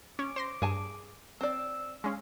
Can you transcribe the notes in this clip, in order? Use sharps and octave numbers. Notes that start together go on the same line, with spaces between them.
C#4 D6
C5 C6 A#6
G2 G#4 G#5 A5
C4 D5 E6
G#3 C#4 F5